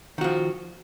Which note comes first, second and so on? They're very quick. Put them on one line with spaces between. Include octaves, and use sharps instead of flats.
D#3 F#4 F3